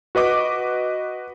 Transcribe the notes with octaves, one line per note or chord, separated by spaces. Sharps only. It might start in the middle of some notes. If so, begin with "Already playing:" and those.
F#4 B4 D#5 D6